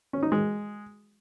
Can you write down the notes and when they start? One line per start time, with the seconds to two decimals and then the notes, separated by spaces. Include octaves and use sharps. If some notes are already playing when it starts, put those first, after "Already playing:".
0.13 C#4
0.23 D#4
0.32 G#3